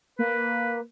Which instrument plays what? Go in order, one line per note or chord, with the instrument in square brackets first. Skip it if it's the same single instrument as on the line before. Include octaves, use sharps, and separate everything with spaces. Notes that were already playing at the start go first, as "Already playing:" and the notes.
[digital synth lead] A#3 [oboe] B4